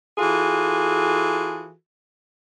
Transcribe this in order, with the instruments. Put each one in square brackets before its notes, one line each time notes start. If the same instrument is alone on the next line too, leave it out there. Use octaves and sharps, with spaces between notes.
[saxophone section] E3 F4 F#4 G#4 A4